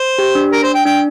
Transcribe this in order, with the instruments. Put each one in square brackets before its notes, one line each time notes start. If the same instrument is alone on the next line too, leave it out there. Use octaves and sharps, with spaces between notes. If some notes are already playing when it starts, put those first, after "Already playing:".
Already playing: [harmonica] C5
[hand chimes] G4
D4
[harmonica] A#4
C5
G5
[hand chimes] D4 [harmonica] G5